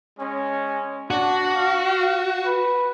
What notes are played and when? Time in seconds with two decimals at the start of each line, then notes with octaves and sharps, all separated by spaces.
0.19 G#3 C#4
1.11 D4 F#4
1.55 F5
2.45 B4